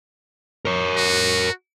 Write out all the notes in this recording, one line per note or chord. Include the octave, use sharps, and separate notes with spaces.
A#4 C#5
F#4